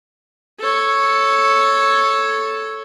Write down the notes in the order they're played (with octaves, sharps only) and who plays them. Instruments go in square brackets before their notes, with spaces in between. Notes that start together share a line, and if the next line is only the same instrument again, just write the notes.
[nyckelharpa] A4 C#5